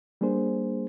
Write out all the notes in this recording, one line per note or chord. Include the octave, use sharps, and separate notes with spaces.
G3 A#3 D4 G#4 C5